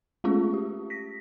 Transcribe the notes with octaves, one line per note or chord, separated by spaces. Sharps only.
G#3 A3 C#4 F4 G#4
G4
A#6 B6